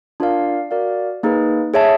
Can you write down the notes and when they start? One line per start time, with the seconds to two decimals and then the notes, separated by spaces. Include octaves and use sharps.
0.20 D4 F4 A#4 D5 F5
0.71 F#4 A#4 D5 F5
1.23 A#3 D#4 G#4 B4
1.74 G#4 C#5 E5 A5